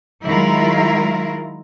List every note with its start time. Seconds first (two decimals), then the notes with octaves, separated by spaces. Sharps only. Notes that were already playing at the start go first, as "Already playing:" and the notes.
0.25 D#3 F#3 G#3 E4 F4 A#4